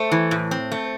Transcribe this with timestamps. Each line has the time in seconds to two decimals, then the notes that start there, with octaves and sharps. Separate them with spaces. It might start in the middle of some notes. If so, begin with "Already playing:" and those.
Already playing: A3 C5
0.11 E3
0.31 A2
0.51 C4
0.72 A3